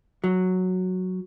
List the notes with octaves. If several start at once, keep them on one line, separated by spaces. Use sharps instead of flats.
F#3